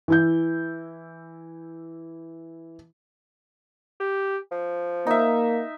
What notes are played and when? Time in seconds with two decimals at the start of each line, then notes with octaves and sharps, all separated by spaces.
0.08 E3 E4 G6
4.00 G4
4.51 F3
5.07 A#3 D#4 E5